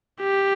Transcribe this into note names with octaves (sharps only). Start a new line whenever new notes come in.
G4